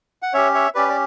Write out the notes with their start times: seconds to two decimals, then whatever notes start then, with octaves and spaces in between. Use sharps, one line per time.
0.22 F#5
0.33 C#4 G4 C#5 E5
0.54 C#5 E5
0.75 C#4 G4 B4 D5
0.88 D5